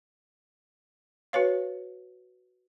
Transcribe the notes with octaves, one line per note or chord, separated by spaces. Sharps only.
F#4 B4 C#5 F5